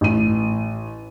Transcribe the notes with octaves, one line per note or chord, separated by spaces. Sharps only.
A1 D#7